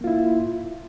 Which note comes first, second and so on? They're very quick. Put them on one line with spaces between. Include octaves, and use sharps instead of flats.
A#3 F4 E4